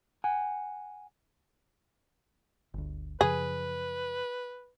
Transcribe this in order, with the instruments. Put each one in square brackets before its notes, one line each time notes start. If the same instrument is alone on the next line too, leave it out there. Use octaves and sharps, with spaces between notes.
[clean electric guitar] F#5 G#5
[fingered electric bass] G1 D2
[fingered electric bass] F#2 C#3 F3 [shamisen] G#4 [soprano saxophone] B4